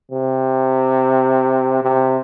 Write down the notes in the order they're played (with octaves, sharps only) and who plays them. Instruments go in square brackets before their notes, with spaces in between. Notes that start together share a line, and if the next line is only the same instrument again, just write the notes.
[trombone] C3
C3